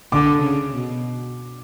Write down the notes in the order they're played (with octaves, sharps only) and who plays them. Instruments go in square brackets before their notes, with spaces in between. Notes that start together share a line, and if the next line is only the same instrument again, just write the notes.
[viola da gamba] D3 [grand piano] D6
[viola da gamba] C#3
B2